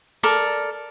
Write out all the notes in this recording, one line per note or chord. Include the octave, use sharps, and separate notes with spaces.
A4 A#4 D5